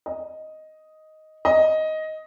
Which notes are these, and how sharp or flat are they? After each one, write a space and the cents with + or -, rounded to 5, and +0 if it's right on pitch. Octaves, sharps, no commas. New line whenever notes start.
D#5 +5
D#5 +10